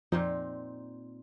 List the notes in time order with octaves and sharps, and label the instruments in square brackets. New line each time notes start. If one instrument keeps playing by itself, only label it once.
[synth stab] F2 [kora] A#2 C4 D#4